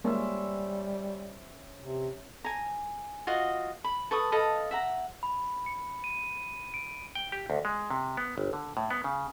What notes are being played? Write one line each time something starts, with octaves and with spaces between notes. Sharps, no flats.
G3 G#3 A#3 C#4 C5 E5
C3
G#5 A#5
F4 F#4 D#5 F#5
B5
A4 B4 C#6 D#6
A4 D#5 F5 B5
E5 F#5 A#5
B5
C#7
D#7
D7
G5
G4
D2
G#3
C3
B3
G1
D3
A2
B3
C#3